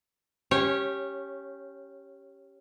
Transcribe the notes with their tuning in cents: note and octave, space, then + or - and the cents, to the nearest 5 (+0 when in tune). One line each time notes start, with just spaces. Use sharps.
C#4 +0 G4 +0 C#5 -20